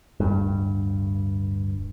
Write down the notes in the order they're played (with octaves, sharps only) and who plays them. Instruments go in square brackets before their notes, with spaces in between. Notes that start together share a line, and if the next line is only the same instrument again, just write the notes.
[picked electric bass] D1 G2